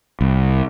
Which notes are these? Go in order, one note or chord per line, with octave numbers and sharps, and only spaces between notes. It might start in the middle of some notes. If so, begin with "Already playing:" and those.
C2